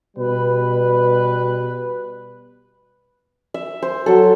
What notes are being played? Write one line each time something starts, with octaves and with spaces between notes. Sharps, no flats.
B2 G3 B4
E5
C5
F#3 A4